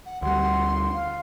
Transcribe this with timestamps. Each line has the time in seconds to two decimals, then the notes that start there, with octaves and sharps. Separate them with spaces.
0.06 F#5
0.22 D2 G3 F#5 C6
0.94 F5